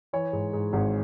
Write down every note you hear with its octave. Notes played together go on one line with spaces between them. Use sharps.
E3 C#5
G#2
G#2
G#1